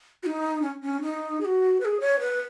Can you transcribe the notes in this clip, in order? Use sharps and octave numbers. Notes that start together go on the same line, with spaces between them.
F#4
D#4
C#4
C#4
D#4
G#4
F#4
B4
G#4
C#5
B4